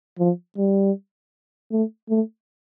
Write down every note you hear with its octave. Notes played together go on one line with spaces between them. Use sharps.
F3
G3
A3
A3